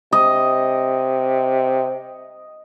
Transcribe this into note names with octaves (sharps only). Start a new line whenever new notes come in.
C3 D#5